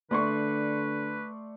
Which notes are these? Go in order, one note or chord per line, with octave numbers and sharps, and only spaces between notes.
D3 A3 B4 D5 C6 C#6